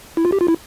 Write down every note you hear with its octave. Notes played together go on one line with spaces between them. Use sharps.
E4
F4
G4
F4
E4